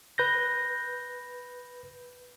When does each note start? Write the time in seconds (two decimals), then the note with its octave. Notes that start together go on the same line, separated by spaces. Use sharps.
0.18 B4 G6 A#6